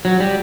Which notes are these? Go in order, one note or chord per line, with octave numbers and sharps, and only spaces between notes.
F#3
G3